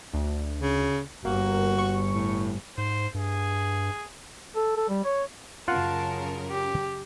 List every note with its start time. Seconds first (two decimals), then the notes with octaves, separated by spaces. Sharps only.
0.13 D2
0.59 C#3
1.25 G1 A#3 F#4
1.78 C#6
2.11 A2
2.78 G#2 C5
3.14 G2 G#4
4.56 A4
4.77 A4
4.89 G3
5.04 C#5
5.68 F#2 C#3 F4 A#4 F#5 A5
6.51 G4